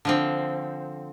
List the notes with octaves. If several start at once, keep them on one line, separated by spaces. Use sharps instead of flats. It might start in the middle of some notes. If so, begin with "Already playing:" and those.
D3 F3 C4